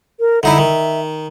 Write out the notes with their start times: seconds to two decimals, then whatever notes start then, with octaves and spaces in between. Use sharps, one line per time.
0.20 A#4
0.43 D3 D#4 E4 E5
0.58 D#3